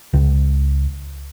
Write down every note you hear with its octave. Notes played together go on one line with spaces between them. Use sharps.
C#2